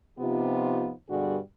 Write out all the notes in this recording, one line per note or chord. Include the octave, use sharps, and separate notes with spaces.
C3 F3 B3 D#4 F4 G4
G2 B2 D3 G3 F#4 G#4